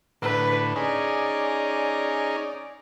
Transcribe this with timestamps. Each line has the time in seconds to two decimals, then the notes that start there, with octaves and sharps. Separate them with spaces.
0.22 A2 D3 B4
0.76 C#4 D#4 G#4 D5